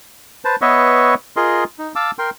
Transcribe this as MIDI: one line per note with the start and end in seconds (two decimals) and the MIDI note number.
0.45 0.56 71
0.45 0.56 72
0.45 0.56 81
0.61 1.14 59
0.61 1.14 71
0.61 1.14 73
0.61 1.14 75
0.61 1.14 76
0.61 1.14 85
1.36 1.64 65
1.36 1.64 68
1.36 1.64 70
1.36 1.64 75
1.36 1.64 84
1.79 1.92 63
1.95 2.11 77
1.95 2.11 81
1.95 2.11 86
1.95 2.11 88
2.19 2.30 70
2.19 2.30 79
2.19 2.30 84